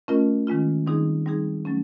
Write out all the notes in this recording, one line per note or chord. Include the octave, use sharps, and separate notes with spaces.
A3 C#4 F4 A#4 D#5
D#3 G#3 C#4 F4
D#3 G3 C4 D#4 G#4
G3 C4 D#4 G#4
F#3 A3 C#4